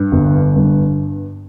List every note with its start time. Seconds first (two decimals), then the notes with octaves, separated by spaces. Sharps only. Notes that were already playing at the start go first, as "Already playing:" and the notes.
Already playing: G2
0.12 G1
0.56 G2